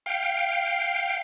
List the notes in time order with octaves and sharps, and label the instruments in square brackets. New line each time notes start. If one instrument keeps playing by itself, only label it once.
[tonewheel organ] F5 G5